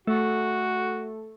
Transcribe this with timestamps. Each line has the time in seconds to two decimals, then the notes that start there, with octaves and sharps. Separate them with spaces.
0.07 A3 F#4